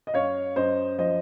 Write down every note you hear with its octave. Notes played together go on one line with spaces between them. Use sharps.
D#5
F#2 C#5 F5
F#2 C5 D#5
F3 C5 D#5